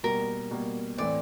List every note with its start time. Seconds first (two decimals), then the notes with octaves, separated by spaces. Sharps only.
0.03 B2 G3 A#3 A#4
0.51 B2 G3 A#3
0.98 A2 E3 A3 C4 D5